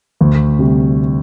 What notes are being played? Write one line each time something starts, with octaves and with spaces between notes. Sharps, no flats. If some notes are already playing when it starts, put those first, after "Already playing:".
D2
C3 G3